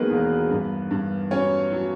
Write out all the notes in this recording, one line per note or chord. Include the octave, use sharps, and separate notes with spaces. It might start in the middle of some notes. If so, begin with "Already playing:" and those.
Already playing: D#3 F#3 G#3 A#3 B3 A#4 B4
E1
G2
G2
F#3 C#4 C#5
F#3